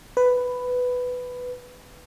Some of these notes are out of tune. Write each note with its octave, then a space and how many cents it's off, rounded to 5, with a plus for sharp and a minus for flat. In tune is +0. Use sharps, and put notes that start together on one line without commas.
B4 +10